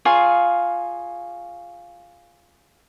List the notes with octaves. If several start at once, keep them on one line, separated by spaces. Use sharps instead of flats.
F4 G#4 C#5 F5